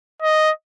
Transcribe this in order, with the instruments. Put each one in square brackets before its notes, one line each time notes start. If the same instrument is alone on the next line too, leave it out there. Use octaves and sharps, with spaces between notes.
[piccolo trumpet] D#5